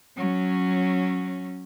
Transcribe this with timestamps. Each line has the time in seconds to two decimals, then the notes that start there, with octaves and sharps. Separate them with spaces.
0.17 F#3 C#4